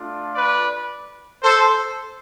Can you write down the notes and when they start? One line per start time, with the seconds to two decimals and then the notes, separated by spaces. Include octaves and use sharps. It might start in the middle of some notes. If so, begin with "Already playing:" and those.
Already playing: A3 D4 F4
0.35 B4 D5
1.43 A4 C5